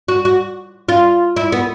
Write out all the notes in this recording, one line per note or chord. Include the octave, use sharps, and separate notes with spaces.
F#4
F#4
F4
E4
B3